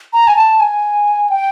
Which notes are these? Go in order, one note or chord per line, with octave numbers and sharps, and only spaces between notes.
A#5
G#5
A5
G#5
G5